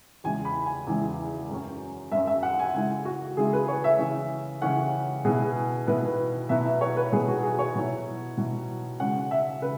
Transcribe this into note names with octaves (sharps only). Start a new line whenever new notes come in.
E2 C#3 G#3 E4 G#5
B5
G#5
E2 C#3 G#3 E4
F#2 F#3 C#4
F#2 F#3 C#4 E5
E5
F#5
G#5
C#3 G#3 E4 G#5
F#4
C#3 G#3 E4 G#4
B4
C#5
E5
C#3 E3 C#4
C#3 E3 C#4 F#5
B2 B3 E4 G#4
B2 B3 E4 B4
B2 F#3 B3 E4 E5
E5
C#5
B4
B2 F#3 B3 E4 G#4
F#4
G#4
C#5
B2 F#3 E4
B2 F#3 E4
C#3 G#3 C#4 F#5
E5
C#3 B4